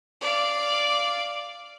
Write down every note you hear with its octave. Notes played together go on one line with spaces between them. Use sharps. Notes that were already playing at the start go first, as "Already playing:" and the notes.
D5 F5